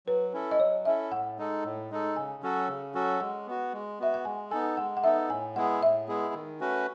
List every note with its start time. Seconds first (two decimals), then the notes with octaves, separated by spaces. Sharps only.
0.07 F#3 B4
0.33 C#4 E4 A4
0.51 D#5
0.59 F#3 C#5
0.85 C#4 E4 A4 E5
1.11 A2 F#5
1.38 G#3 D#4 A4
1.64 A2
1.90 G#3 D#4 A4
2.16 C#3 G#5
2.42 F#3 C#4 F#4 A4
2.68 C#3
2.94 F#3 C#4 F#4 A4
3.21 G#3 F#5
3.47 B3 F#4
3.73 G#3
3.99 B3 F#4 E5
4.14 F#5
4.25 G#3 G#5
4.51 B3 D#4 A4 G#5
4.77 G#3 F#5
4.97 F#5
5.03 B3 D#4 A4 E5
5.29 A2 G#5
5.55 G#3 B3 E4 G#4 F#5
5.82 A2 E5
6.08 G#3 B3 E4 G#4
6.34 D#3
6.60 A3 C#4 F#4 B4